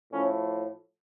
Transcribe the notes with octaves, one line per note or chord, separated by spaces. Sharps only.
A2 F3 C#4